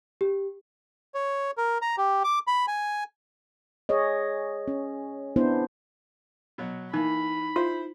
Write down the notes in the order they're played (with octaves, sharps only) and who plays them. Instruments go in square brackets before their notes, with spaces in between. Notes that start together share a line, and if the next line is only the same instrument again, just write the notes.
[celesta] G4
[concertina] C#5
A#4
A#5
G4
D6
B5
G#5
[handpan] G#4 C#5 D#5
C#4
B3 D4 E4 C5
[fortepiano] B2 F#3
[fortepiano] E3 A#3 [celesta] D#4 [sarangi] B5
[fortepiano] E4 C5 [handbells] F4